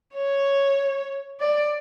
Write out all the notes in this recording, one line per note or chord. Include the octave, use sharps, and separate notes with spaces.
C#5
D5